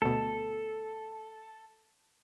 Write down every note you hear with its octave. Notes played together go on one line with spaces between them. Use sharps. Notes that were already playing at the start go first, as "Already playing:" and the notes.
D2 B2 A4